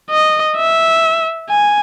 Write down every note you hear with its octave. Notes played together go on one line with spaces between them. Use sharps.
D#5
E5
G#5